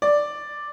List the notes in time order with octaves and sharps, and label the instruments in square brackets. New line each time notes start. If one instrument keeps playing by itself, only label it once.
[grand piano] D5